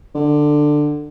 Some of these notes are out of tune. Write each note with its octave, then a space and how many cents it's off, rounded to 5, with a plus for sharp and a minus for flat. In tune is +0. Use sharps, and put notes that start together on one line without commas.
D3 +15